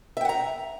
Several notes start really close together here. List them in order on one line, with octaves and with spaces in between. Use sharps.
E5 G5 F#5 A#5